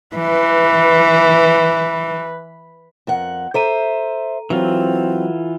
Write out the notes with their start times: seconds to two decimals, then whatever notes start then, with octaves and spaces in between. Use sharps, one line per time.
0.17 E3 B4
3.07 F2 A#4 F#5
3.54 A4 C5 E5 A#5 D#7
4.50 E3 F#3 C4 F4